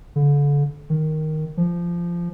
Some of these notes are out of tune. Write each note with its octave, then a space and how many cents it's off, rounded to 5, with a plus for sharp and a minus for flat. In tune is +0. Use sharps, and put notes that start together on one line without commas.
D3 -35
D#3 +0
F3 -15